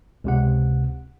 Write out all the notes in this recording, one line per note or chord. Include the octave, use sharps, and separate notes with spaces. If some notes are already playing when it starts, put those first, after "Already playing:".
C#2 C3 F#5